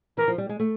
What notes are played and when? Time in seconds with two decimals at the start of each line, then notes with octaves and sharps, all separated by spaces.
0.17 E3 A#4
0.28 F3
0.38 G3
0.49 G#3
0.60 A3